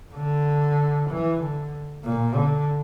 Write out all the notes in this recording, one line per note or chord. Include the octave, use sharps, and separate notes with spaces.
D3
E3
D3
A#2
D3